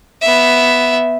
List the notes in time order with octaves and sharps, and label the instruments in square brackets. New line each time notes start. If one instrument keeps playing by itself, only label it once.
[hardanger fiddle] B3 E5